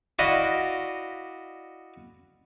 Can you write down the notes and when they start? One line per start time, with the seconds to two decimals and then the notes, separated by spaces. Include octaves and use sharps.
0.19 E4 F#4 D5 D#5 F5